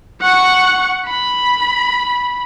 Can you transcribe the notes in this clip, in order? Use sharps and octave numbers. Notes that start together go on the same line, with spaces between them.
F#5 C#6
B5